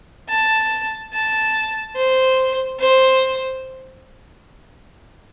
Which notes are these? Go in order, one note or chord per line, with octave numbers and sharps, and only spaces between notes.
A5
A5
C5
C5